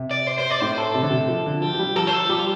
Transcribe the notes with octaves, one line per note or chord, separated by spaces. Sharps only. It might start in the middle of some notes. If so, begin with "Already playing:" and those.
Already playing: C3
D5
C5
C5
D5
A2 C5
A4
C3
D3
C3
F3
D3
F3 G4
F3
G3
F3 A4
C5
A4
G3 G4
F4